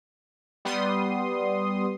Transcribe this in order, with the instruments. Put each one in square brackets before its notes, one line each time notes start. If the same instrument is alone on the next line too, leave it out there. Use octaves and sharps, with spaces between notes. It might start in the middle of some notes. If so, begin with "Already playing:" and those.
[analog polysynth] G3 B3 C6 D#6